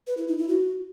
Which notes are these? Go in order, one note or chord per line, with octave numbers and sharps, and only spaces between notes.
B4
E4
D#4
E4
F#4